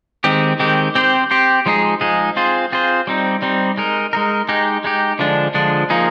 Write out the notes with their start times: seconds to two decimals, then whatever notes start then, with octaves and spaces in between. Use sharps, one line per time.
0.24 D#3 G#3 C4 G4
0.60 D#3 G#3 C4 G4
0.95 C4 G4 C5
1.31 C4 G4 C5
1.66 F3 G#3 D#4 G#4
2.01 F3 G#3 D#4 G#4
2.36 C4 F4 G#4 C5
2.72 C4 F4 G#4 C5
3.07 G3 C4 D#4
3.42 G3 C4 D#4
3.78 G#3 D#4 A#4
4.13 G#3 D#4 A#4
4.49 G#3 D#4 G4
4.84 G#3 D#4 G4
5.19 D3 F3 G#3 D4
5.54 D3 F3 G#3 D4
5.90 F3 A#3 D#4 G#4